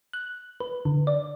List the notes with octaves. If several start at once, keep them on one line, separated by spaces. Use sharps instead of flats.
F#6
B4
D3
D5